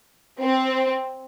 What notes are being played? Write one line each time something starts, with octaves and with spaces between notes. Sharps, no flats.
C4